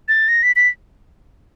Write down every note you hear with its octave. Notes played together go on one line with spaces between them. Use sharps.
A6
A#6
B6
B6